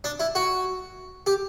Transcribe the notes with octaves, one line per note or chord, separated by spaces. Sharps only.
D4
E4
F#4
G4